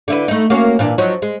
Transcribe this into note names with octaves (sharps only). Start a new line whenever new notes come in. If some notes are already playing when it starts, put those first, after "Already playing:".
D3 E4 B4
A3 D#4
A#3 C#4 F#4
A#2 E3 D4
F3 F#3 D#4
G#3